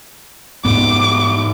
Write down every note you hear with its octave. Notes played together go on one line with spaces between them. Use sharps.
G#2 B3 D6